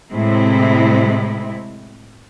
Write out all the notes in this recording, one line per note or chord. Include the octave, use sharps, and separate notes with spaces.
A2 C3 G#3 C4 E4